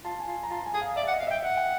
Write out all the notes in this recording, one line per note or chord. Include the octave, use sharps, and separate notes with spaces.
F4 A5
G#5
F4
A#5
F4 A5
G#5
G#4
F5
D5 E5
F#5
D#5
F5
D#5
E5 G5
E5 F#5
G5